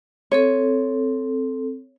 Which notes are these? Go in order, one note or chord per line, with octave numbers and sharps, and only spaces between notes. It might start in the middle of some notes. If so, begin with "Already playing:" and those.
C4 A4 C#5